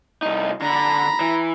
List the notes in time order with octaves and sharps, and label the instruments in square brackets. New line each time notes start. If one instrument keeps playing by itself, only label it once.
[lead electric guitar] C2 D#4
[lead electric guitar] D3 [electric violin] A#5 B5
[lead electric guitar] E3